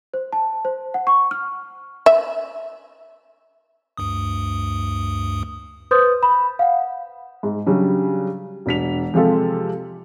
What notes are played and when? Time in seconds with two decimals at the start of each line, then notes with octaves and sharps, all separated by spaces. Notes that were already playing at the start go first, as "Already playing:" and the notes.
0.14 C5
0.33 A5
0.65 C5
0.94 F#5
1.07 C#6
1.31 F6
2.06 E5
3.97 D2 G2 D#6
5.91 B4 C5 C6 D#6 G6 A6
6.23 B5
6.59 F5 F#5
7.43 G#2
7.66 C#3 F#3 G3 D4
8.66 E1 D4 B6 F7
9.14 C3 F3 G#3 F4 G4 A4